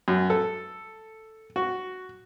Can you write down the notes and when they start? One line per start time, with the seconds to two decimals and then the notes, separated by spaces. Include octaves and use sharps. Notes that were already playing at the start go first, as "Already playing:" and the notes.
0.08 F#2
0.30 A4
1.56 F#4